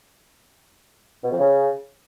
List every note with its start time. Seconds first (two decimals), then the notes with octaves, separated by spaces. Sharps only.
1.24 B2
1.31 F2
1.38 C#3